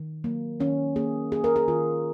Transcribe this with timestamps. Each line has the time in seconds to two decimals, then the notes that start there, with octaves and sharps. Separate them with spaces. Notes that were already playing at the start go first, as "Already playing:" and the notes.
Already playing: D#3
0.24 F#3 A#3
0.60 D#3 C#4
0.96 A#3 G#4
1.32 A#3 G#4
1.44 A#4
1.56 G#4
1.68 D#3 F4